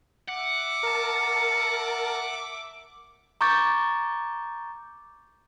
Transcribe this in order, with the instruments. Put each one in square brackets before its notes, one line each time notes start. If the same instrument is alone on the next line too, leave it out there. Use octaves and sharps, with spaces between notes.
[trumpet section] E5 D6 [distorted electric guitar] F#5
[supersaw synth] A#4 A5
[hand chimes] A#5 C#6 D6 G6 A6